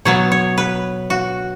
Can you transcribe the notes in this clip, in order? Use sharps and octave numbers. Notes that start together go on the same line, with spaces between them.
B2 F#3 B3 C#5
C#5
B4
F#4